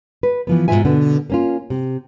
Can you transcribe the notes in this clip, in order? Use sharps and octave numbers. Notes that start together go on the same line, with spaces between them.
B4
E3 F3 B3
G#2 B2 G#3 F4 E5 G#5
B2 D3 B3
A#3 C#4 F4
C3